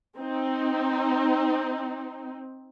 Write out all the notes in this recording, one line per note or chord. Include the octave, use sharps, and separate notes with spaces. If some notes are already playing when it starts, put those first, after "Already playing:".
C4 D#4